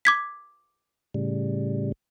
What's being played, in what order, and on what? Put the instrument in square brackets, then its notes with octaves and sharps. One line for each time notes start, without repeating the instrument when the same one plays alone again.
[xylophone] D6 G#6 B6
[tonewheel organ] A2 C#3 G3